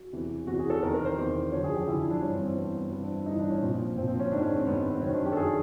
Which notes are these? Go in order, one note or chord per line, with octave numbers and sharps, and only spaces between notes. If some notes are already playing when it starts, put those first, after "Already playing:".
Already playing: F#4
E2 C3 E3
E2 C3 E3 F#4
G#4
A4
E2 C3 D#3 A#4
A#4
C5
E2 C3 D#3
F#2 D3 F3 C#5
G#4
G4
F#2 D3 F3 E4
D4
G2 E3 C#4
C4
C4
G2 E3 B3
B3
G2 E3 C4
D4
E4
G2 E3 D#4
D4
C#4
A#2 F3 C4
A#2 F3 C4
C4
C#4
G#2 D#3 D4
C#4
C4
G#2 D#3 B3
C4
C4
F#2 D#3 C#4
D4
G4
A4
F#2 D#3 G#4